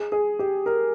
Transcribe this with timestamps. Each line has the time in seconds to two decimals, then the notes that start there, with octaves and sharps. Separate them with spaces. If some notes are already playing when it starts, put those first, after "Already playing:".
Already playing: G#4
0.12 G#4
0.39 G4
0.66 A#4